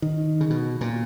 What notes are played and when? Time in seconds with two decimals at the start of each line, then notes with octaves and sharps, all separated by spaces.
0.02 D#3
0.41 C#3
0.50 B2
0.81 A#2